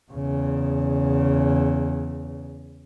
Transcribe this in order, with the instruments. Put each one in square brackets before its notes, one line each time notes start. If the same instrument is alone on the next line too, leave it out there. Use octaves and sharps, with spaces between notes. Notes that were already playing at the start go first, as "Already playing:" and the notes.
[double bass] E2 C#3